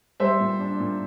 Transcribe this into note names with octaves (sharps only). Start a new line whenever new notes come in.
G3 C5 E5
A#2
D4
A#2